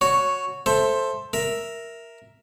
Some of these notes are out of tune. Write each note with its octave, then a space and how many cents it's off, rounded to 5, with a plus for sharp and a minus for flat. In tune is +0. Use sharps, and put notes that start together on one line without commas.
F#4 -10 C#5 +0
A4 +0 C5 +10 E5 +5
A#4 +0 E5 +0